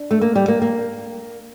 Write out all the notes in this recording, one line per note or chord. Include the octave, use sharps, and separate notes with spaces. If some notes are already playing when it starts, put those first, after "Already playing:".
Already playing: D4
A3
A#3
G3
A#3
A#3